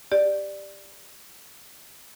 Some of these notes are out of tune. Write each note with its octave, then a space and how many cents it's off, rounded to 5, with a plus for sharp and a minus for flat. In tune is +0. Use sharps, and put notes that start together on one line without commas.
G4 +10 D5 +10